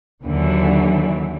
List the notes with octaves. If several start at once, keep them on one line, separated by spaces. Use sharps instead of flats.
D#2 D3 E3 F#3